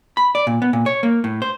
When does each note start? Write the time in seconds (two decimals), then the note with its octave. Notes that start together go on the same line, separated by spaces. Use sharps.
0.17 B5
0.35 D5
0.47 A#2
0.62 B3
0.73 A#2
0.86 C#5
1.03 A#3
1.24 A2
1.42 C5